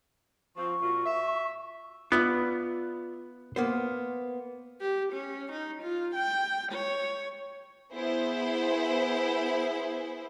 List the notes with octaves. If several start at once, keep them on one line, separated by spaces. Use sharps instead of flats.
F3 C4 F4 C#6
A#2 F4 F#4
E5
B3 F4 D5 E5
A#3 B3 C5
G4
C#4
D#4
F4
G5
C#5
B3 E4 G#4 C5